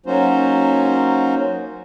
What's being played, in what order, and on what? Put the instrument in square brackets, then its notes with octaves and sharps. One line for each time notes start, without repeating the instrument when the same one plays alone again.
[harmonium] F#3 A#3 C#4 D#4 F#4 C5